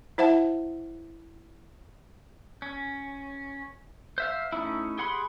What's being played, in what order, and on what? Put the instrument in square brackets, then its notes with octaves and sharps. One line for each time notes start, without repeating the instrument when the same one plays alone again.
[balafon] E4 C5 E5 F#5 A5
[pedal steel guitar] C#4
C5 E5 F5
A3 C#4 D#4 E4
G4 G#4 F#5 B5 C6